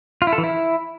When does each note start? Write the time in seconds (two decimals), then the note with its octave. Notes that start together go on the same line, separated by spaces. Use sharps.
0.22 F4
0.27 E4
0.33 A4
0.38 E3
0.44 E4